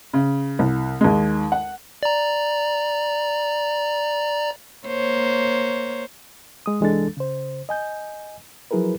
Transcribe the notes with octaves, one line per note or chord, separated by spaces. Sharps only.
C#3
C2
D#2 G#3
F#5
D5 A#5
A#3 C5 C#5
G#3 D#6
C2 E3 G#3 D4 A4 A6
C#3 C5
D#5 G#5 G6
F3 F#3 E4 G#4 A#4 B4